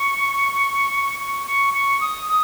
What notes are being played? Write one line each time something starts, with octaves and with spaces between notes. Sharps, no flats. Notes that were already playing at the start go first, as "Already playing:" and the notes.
Already playing: C#6
C#6
C#6
C#6
D#6
D#6